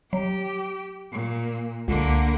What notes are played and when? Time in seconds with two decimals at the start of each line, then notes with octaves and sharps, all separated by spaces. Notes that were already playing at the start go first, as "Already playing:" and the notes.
0.13 F#3 G4
1.11 A#2
1.88 C#2 D3 A#3